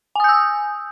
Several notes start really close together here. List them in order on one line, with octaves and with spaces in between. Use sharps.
G#5 D#6 G6 E6